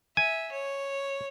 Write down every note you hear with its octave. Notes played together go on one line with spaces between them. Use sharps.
E5 G#5
C#5